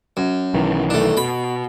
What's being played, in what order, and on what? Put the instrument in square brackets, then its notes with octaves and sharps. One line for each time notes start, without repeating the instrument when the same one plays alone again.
[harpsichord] F#2
[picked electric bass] B1 D#3 E3
[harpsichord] A3 D4
[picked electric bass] B2 [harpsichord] B5